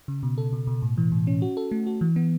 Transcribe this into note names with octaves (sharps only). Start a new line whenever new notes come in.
C#3
B2
A4
B2
B2
A2
E3
A2
C#4
F#4
A4
A3
F#4
E3
B3